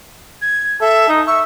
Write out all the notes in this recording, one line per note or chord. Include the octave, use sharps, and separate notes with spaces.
G#6
A4 E5
D#4
E5 C#6